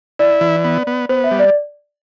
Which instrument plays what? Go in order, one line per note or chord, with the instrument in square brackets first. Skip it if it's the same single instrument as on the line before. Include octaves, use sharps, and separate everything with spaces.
[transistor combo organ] E4 [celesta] D5
[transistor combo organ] E3
B3
B3
[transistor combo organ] B3 [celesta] C5
[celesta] E5
[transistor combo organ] G3
[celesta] D5